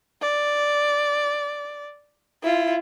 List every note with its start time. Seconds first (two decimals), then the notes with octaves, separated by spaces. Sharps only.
0.22 D5
2.43 E4 F4